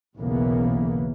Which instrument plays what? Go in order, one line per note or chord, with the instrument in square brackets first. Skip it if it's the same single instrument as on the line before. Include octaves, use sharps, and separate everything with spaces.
[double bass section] B1 E2 C#3 E3 A#3 B3